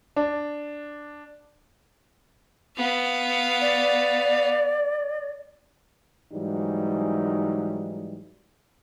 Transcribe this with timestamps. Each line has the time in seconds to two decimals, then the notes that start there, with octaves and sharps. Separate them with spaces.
0.16 D4
2.77 B3 F5
3.61 D5
6.32 G#2 E3 F#3 G3 D#4